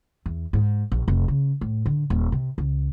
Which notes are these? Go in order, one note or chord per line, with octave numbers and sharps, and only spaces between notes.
E2
G#2
A#1
F1
C#3
A2
D3
D#1
C3
C#2